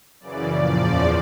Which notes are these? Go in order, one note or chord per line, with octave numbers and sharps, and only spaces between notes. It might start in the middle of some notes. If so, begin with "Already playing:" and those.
F#2 C#3 E3 D5
A#2 F3 D5
E2 C#3 F3